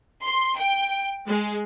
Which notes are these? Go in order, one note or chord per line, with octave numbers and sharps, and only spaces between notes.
C6
G5
G#3